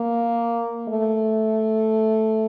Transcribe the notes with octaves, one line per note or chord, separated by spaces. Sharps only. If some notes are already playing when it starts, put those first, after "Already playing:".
Already playing: A#3
A3